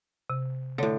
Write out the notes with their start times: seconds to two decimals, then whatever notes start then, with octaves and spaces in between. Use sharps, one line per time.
0.30 C3
0.78 A2 D3 C#5